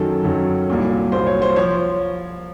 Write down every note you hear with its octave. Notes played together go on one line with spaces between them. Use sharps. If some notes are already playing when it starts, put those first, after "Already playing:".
Already playing: F#2 D#3 F#3 A4
F#2 D#3 F#3
C2 A#2 F#3
C2 A#2 F#3 C5
C#5
C5
F3 C#5